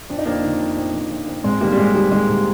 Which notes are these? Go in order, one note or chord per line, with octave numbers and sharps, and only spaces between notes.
F2 D4
D#4
F2 A#3 D4
D#3
F2
F2
F2
F2
F2
G#2 G#3 C4
D#3 G3 A#3
G3
G#2 G#3
D#3 G3
D#3 G#3
G#2